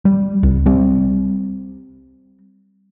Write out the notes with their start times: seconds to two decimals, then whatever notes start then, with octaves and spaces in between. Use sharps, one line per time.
0.05 G3
0.43 C2
0.66 G3 C4